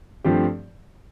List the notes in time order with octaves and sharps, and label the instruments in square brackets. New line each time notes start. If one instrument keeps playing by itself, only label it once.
[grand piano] G2 F3 A3 C4 G4